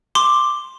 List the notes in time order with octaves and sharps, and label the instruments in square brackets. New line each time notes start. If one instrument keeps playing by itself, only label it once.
[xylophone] C6 D6